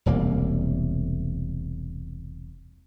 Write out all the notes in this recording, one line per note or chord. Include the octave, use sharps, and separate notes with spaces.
E1 C2 A#3